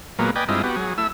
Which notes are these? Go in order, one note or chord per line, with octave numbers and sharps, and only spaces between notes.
A#2 F#3 G#3 A#3 B3
B4 D5 D#5 G5 G#5
G2 G#3 C4 E4 F4 D#5
B3 F#4 G4
F#3 G#4
A3 E4 E6